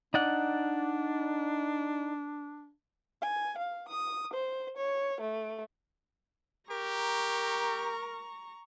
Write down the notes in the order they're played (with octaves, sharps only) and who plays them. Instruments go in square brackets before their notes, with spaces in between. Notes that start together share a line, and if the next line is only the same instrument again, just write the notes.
[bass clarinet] D4 [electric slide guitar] D#4 D5 F#5
[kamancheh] G#5
F5
D#6
C5
C#5
A3
[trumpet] G4 [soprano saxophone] A#4 [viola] A#5 C#6